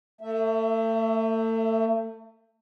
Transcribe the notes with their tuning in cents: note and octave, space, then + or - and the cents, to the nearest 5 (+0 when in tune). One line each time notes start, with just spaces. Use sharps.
A3 +35 E5 +0